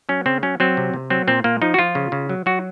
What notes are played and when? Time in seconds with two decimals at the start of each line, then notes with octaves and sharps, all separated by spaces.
0.09 F#3 C#4
0.26 C#3 C4
0.43 F#3 C#4
0.60 F#3 C4
0.77 C3
0.94 C3
1.10 F#3 C4
1.27 A#2 C4
1.44 A#2 A#3
1.62 F3 D#4
1.74 F#4
1.79 F3 F4
1.95 C#3
2.12 C#3
2.29 F#3
2.46 F#3 F#4